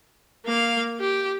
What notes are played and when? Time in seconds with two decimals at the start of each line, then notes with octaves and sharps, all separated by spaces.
0.46 A#3 F5
1.00 G4